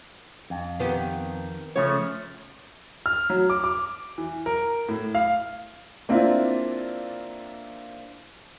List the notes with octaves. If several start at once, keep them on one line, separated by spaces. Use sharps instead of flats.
F2
D#3 B3 G4
C#3 F3 A3 C#5
F6
F#3
D6
D6
E3
A#4
A2
F5
A#3 C4 D4 E4 F4